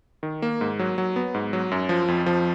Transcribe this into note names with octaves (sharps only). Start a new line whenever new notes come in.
D#3
A#3
G#2
F#3
F#3
B3
G#2
F#3
F#2
F3
F2
F3